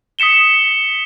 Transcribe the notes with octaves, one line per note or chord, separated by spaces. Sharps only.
D#6 B6 C#7 E7 G7